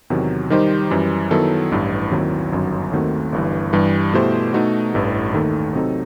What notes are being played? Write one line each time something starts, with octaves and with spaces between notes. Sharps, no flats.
E2 C3 D#3 F#3
D#3 G3 D#4 G4 C5
F#2 E3 G3
D#3 F#3 B3 E4 A4
A1 G2 E3
D#2 D#3 F#3 C4 E4
G1 F#2 D#3 F#3
D#2 D#3 A3 C4 F#4
G1 G2 E3
G2 E3 G3
B2 A3 E4 G4 C5
B2 A3 D#4 F#4
A1 G2 E3 A3
D#2 D#3 A3 D#4
C3 F#3 C4 D#4 A4